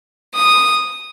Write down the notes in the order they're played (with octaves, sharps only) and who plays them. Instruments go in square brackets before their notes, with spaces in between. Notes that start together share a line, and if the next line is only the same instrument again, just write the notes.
[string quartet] D#6